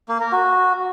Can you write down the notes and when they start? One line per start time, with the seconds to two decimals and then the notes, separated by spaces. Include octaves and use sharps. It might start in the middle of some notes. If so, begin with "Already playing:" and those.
0.09 A#3
0.20 A#4
0.32 F#4